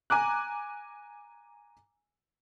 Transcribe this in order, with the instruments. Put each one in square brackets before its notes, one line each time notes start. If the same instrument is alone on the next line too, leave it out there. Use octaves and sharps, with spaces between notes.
[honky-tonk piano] G#5 A#5 D6 F#6